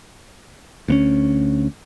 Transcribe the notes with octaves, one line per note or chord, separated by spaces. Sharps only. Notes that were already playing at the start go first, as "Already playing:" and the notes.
D2 B3 C#4